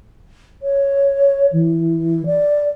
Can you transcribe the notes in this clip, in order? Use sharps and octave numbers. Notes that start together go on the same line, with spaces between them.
C#5
E3
D5